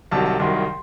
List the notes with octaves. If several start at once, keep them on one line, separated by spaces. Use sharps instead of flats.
C2 C3 D#3 F#3 A5
A5
C2 C3 D#3 F#3 C6